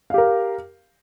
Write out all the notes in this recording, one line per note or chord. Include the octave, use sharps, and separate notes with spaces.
G4 A#4 F5